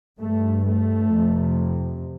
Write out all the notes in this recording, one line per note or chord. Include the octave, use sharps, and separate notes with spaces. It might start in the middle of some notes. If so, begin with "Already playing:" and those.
G2 A3
A3
F2 C3